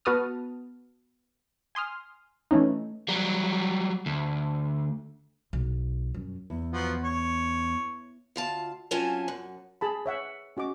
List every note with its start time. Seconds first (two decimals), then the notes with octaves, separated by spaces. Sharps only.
0.05 B3 F#4 B4 A5 D#6 F6
1.75 G#5 C6 D#6 F6
2.51 E3 A3 C#4 D#4
3.08 F#3 G3
4.06 D2
5.53 B1
6.14 F#2
6.50 E2
6.72 F3 F#3 B3
7.03 C#5
8.36 D2 F4 A5
8.91 F#3 C4 C#4 F4 G#5 A5
9.28 F#2
9.81 G#4 A5 B5
10.06 C#5 E5 F#5
10.57 C#4 F#4 D#5 D6